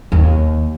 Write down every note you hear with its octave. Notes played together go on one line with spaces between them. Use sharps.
D#2